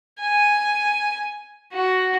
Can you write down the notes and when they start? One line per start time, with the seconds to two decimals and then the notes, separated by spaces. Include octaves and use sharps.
0.21 G#5
1.73 F#4